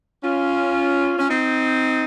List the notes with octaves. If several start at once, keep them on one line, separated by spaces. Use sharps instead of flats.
C#4 F4
C#4
C4 D#4